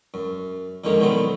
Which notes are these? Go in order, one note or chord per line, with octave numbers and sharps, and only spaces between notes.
F#2
F2 D3 D#3 G#3 A#3 C#4
B2 D#3 F#3 A3 B3 C4